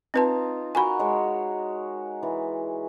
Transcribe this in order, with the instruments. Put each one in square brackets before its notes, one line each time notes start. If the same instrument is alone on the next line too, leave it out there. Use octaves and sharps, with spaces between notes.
[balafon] C4 B4 A5 [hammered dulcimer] D#4 F4
[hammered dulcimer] F#4 A#4 [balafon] G#5 B5
[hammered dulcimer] G#3 C#5
E3